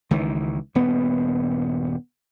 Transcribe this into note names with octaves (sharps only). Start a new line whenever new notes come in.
C#2 D#3 E3
D#1 G2 B3